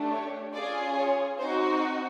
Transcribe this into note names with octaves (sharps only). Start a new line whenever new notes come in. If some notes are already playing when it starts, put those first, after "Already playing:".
Already playing: A3 D4 G4
C#5
C#4 F4 G#4 D5
C#5
C4 D#4 F#4 C5